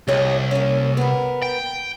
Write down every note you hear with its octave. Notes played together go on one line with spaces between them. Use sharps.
C2 G4 C#5 D#5
A#3 C#4
B3 A#4
G5